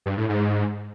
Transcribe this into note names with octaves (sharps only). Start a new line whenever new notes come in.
G2
A2
G#2